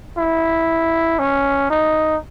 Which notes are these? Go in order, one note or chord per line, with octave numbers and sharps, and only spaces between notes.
E4
C#4
D#4